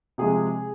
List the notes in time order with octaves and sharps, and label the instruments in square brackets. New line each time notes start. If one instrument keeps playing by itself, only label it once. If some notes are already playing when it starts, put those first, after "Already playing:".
[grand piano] C3 F3 G#3 [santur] G#4